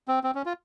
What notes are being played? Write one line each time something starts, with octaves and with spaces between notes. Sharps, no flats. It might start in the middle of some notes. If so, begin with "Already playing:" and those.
C4
C4
C#4
F4